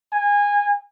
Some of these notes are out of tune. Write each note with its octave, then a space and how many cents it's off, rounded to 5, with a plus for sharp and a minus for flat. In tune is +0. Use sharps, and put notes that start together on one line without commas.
G#5 -20